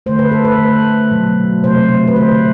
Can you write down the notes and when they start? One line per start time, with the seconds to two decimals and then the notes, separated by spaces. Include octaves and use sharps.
0.06 D3 A3 C5
0.19 B4
0.31 A4
0.44 B4
0.58 D3 A3
1.11 B2 F#3 A3
1.64 C3 F#3 A3 C5
2.07 B4
2.16 D3 A3 C5